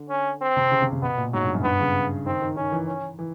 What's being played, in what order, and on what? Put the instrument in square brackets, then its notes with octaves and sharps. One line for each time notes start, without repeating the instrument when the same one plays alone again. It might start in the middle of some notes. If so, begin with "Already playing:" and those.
Already playing: [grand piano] D3
[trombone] C#4
C4
[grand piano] C3
C#3
C3
C3
[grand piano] B2 [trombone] B3
[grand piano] A#2
[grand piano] G#2 [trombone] F#3
[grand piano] G2
F#2
[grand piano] G2 [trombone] B3
[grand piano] C#3
[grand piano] D#3 [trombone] C4
[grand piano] D#3
[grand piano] D#3 [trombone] C#4
[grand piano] E3
[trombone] C#4
[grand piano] E3